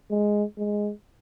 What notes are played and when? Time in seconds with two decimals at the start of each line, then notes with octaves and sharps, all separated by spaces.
0.11 G#3
0.57 G#3